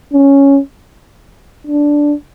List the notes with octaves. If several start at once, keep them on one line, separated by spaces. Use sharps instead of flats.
C#4
D4